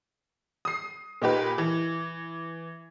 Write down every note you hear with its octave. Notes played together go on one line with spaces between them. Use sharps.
D#6 C7
A#2 D#4 G4 B4
E3